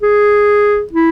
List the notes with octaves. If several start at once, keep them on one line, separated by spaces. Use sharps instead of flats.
G#4
E4